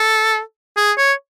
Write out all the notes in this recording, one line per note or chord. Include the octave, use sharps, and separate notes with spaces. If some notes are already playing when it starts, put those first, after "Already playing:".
Already playing: A4
G#4
C#5